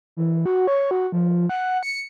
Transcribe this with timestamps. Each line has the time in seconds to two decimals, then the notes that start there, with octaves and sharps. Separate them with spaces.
0.17 E3
0.46 F#4
0.67 C#5
0.91 F#4
1.12 F3
1.49 F#5
1.83 C#7